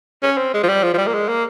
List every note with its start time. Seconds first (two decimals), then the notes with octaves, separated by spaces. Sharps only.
0.23 C#4
0.37 C4
0.54 G#3
0.63 F3
0.69 G3
0.83 F3
0.94 F3
0.98 G3
1.07 A#3
1.14 G#3
1.28 A#3